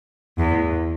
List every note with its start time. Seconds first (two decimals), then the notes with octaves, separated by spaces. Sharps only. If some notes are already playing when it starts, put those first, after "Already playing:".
0.38 E2